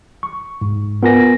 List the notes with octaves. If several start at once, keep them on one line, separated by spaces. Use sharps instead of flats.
C#6
G#2
B3 F4 A#4 G#5 A#6